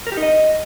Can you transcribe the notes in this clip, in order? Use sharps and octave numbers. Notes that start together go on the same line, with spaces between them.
A#4
G4
D#4
D#5